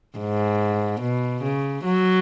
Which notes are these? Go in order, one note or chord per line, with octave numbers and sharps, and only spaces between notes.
G#2
B2
C#3
F#3